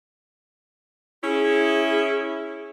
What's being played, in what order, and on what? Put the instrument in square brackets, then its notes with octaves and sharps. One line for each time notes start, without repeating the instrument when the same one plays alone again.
[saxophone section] C#4 E4 [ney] G#4